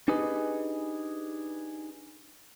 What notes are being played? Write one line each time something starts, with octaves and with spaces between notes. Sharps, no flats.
D4 D#4 G4 G#4 B4 D#5